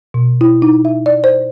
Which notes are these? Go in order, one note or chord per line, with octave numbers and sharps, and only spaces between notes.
B2
E4
D#4
E5
D5
C5